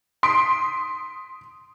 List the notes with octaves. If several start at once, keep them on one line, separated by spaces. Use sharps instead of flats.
C6 D#6 B6 D7